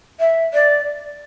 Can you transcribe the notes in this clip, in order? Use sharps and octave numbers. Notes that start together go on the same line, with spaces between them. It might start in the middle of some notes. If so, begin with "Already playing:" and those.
E5
D5